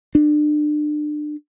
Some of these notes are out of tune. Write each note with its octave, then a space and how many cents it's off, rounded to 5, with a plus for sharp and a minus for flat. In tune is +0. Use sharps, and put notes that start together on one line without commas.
D4 +30